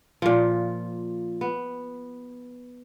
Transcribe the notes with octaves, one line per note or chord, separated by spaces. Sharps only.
A#2 F3
B3